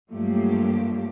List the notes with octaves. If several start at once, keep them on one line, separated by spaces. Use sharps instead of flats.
G2 F3 F#3 A3 A#3 G4